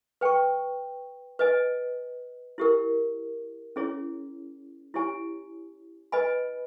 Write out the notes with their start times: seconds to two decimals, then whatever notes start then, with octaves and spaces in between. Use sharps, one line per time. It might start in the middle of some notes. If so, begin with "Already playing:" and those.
0.21 B4 G5 C#6
1.39 B4 D#5 G#5
2.58 E4 G4 A#4
3.76 C#4 E4 G#4 C#5
4.94 E4 G4 C#5 G#5
6.12 B4 D#5 G#5 B5